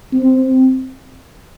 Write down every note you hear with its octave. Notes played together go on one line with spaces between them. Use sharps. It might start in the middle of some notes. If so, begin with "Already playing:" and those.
C4